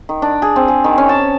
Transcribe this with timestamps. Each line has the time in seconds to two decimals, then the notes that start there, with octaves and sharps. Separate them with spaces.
0.09 D#3
0.22 D4
0.42 G#4
0.56 C4
0.68 G#4
0.84 D#3
0.98 C#4
1.09 A5